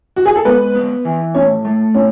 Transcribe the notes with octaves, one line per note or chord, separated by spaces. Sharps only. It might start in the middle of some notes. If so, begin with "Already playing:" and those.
F#4
G#4
A4
G#2 B3 B4
B3
E3
A2 C#4 C#5
A3
A2 C#4 C#5